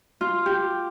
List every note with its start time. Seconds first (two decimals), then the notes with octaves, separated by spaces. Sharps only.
0.21 F4
0.46 G4